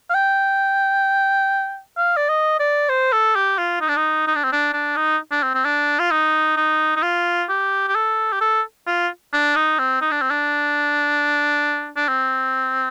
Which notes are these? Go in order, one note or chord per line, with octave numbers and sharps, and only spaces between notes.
F5
G5
F5
D5
D#5
D5
C5
A4
G4
F4
D#4
D4
D#4
D#4
D4
C4
D4
D4
D#4
D4
C4
C4
D4
F4
D#4
D#4
D#4
F4
G4
G4
A4
G4
A4
F4
D4
D#4
C4
D#4
D4
C4
D4
D4
C4